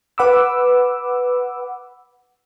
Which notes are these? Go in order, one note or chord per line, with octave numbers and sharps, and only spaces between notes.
B4 F#5 B5 D6 E6